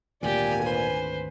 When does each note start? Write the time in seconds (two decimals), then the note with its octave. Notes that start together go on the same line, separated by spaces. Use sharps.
0.23 G#1 D2 A#2 D3 G4 D5 G#5
0.62 B4 C5